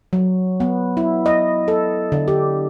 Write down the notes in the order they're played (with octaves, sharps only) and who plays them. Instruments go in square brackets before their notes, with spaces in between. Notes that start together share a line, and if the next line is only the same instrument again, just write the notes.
[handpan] F#3
B3
E4
D#5
A4
D3
G4